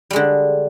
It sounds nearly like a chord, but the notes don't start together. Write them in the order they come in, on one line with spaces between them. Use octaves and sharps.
G3 G#3 D3